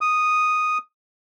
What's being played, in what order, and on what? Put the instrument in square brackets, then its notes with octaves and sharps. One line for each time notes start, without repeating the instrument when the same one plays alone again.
[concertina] D#6